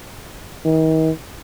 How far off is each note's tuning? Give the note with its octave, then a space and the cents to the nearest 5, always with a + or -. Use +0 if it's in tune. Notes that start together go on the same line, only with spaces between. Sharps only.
D#3 +40